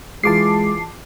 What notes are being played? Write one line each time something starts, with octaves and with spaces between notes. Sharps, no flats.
E3 G#3 F4 G#4 A5 D6 C7